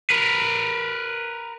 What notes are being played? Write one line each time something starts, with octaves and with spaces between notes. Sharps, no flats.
A#4 B4